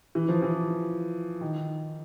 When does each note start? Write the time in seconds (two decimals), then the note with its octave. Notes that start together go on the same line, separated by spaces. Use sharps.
0.15 E3
0.29 F3
0.42 E3
1.41 D#3